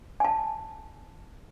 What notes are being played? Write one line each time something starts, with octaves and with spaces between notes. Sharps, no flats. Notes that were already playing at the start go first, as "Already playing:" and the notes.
G#5 A5